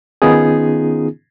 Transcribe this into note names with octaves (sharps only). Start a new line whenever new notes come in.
D#3 B3 C#4 D#4 F4 G#4